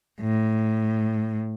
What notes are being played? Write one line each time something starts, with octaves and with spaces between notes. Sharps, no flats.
A2